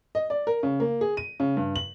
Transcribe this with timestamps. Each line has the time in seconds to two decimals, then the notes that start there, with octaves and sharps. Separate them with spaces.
0.15 D#5
0.30 D5
0.47 A#4
0.63 C#3
0.80 A#3
1.01 G#4
1.17 D#7
1.40 C#3
1.57 G2
1.76 F#7